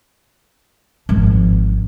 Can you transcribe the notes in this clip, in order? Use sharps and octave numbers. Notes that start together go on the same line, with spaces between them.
G#1 F3